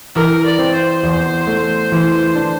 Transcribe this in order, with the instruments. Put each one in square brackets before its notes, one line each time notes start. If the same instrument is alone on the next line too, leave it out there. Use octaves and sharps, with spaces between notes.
[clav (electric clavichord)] E3 [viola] A#4
[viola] D5
[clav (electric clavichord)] C4
[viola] C5
[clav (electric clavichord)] E2
A3
E3
D4